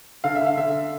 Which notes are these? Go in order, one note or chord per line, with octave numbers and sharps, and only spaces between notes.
D3 F5
E5
D3 F5
D3 E5